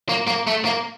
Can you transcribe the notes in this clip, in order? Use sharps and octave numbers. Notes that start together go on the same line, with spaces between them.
A#3
A#3
A3
A#3